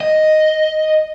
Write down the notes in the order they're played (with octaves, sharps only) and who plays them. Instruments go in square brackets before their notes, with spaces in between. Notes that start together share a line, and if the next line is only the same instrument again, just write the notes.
[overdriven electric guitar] D#5